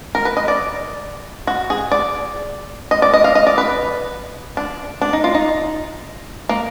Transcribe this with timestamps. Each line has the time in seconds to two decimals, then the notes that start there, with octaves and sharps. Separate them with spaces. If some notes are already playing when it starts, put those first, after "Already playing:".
0.15 A#4
0.25 B4
0.37 D#5
0.48 D5
1.47 F#4
1.70 G#4
1.92 D5
2.91 D#5
3.02 D5
3.14 D#5
3.24 F5
3.35 D#5
3.47 D5
3.58 B4
4.57 D4
5.01 D4
5.13 D#4
5.24 F4
5.35 D#4
6.49 A#3